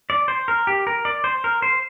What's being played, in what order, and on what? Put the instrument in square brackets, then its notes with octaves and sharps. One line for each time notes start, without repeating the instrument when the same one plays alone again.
[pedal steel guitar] D5
C5
A#4
G4
A#4
D5
C5
A#4
C5